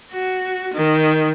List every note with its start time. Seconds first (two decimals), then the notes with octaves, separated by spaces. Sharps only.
0.12 F#4
0.74 D#3